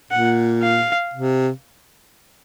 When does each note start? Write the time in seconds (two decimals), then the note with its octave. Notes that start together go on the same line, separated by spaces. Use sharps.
0.11 A#2 F#5
0.63 F5
1.14 C3